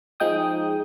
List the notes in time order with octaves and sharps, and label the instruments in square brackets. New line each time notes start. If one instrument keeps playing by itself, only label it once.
[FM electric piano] F3 G#3 D#4 G5 D#6